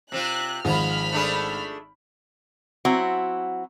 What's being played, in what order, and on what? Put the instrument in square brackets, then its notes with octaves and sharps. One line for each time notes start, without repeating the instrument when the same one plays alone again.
[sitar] C3 C4 F4 [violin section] F#6
[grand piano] G#1 G#2 [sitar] F3 F4 G#4 [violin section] B5 F6
[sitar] A3 D4 G#4
[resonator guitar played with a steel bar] F#3 C4 E4 F#4